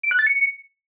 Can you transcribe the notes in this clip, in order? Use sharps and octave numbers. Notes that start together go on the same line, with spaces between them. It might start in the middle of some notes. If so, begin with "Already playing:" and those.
D7
F#6
A6
C#7